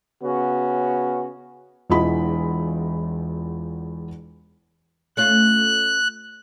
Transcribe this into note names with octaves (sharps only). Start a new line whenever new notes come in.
C#3 B3 C#4 F#4
E1 E2 E4 F4 D#5 B5
A3 C#4 F4 F#6